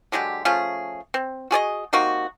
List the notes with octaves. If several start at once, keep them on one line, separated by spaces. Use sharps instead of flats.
D3 F#3 G#3 G4
F3 A3 C#4 G#4
C4
F#4 G#4 D5 D#5
C3 A#3 D#4 F#4